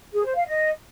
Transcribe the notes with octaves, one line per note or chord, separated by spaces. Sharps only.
G#4
C5
F5
D#5